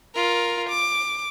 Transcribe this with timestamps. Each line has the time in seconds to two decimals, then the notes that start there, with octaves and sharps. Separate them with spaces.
0.14 F4 A#4
0.69 D6